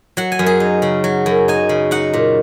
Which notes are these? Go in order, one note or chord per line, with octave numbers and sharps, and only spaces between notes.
F#3 F#5
G#5
F#2
G#4
D#4
C#3
F#3
F#2
D#4 G#5
C#3
D#4 F#5
A#2